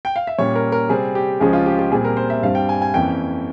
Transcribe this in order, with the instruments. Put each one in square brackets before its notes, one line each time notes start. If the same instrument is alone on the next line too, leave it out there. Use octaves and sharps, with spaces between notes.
[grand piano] G5
F5
E5
A#2 G3 C#4 C#5
A#4
A#4
C3 G3 C4 G#4
G4
C#2 C#3 F3 G#3 C#4 G#4
F4
G4
G4
A#2 G3 C4 G#4
A#4
C5
E5
G2 G3 C4 F5
G5
G#5
G#5
F2 E3 A#3 C#4 G5